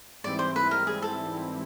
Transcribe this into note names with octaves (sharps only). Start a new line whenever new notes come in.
G#2 E3 G3 C4 E4 D5
C5
B4
A#4
G#4
A4